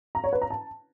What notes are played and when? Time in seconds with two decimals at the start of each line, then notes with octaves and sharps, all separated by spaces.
0.15 A#5
0.24 C#5
0.33 B4
0.42 A#5
0.50 A5